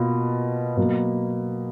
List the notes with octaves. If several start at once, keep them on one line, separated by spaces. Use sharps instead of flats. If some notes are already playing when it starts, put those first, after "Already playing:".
Already playing: B2 A#3 F4
B2 F#3 A#3